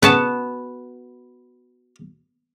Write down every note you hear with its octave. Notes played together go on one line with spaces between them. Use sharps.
C#3 B3 F#4 A5